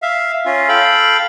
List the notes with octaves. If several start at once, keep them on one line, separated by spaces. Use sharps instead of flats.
E5 F5
C#4 F4
A4 F5 G5 B5